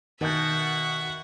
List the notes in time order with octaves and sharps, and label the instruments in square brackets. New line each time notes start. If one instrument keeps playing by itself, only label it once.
[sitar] B2 [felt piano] D#3 G6 [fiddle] E5 F#5